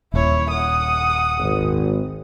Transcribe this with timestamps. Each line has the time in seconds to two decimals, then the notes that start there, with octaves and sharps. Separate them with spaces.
0.14 D#1 E4 C#5
0.51 F#5 D#6
1.39 G#1